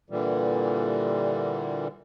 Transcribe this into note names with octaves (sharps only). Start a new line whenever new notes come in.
A#2 D3 E3 G3